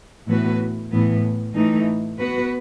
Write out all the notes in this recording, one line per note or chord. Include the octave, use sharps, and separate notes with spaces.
A2 E3 B3 F#4 B4
A2 E3 B3
A2 E3 A3 D#4
B3 F#4 B4